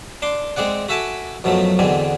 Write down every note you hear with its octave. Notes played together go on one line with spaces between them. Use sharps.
D4 C6 D6
G#3 C4 G#4 D5 F#5
F#4 A4 E5 G#5 A5 D6
F#2 B2 F3 F#3 A3
E2 B2 D3 C4 G#5